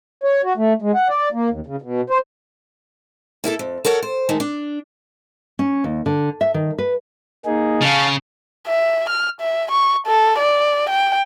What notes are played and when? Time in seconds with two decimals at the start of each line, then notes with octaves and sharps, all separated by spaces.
0.24 C#5
0.44 F#4
0.57 A3
0.82 G#3
0.94 F#5
1.09 D5
1.33 A#3
1.50 D#2
1.67 C#3
1.82 B2
2.10 C5
3.44 A#3 E4 G#4 A4
3.59 F2
3.85 A4 A#4 C#5 F#5
4.02 C5
4.29 D#3 G#3 A3 D#4
4.40 D4
5.59 C#4
5.84 D#2
6.06 D3
6.41 E5
6.54 D#3
6.78 B4
7.45 A#3 D#4 G#4
7.82 C#3 F5 A5 F6
8.67 E5
9.10 F6
9.41 E5
9.71 C#6
10.07 A4
10.38 D5
10.89 G5